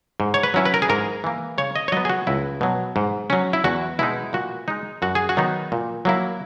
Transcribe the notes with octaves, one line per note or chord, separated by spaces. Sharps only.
G#2
C#5
B4
F#3 C#4 E4
B4
A#4
G#4
G#2 A#4
E3 A#3
C#3 C#5
D#5
C#5
F#3 B3 D#5
G#4
F#4
C#2 E4
B2 F#3
G#2
F#3 C#4
E4
E2 F#4
B2 G#3 D#4 E4
A#2 F#4
G#3 D#4
F#2 F#4
G#4
F#4
D#3 F#3 B3 D#4
A#2
F#3 A#3 E4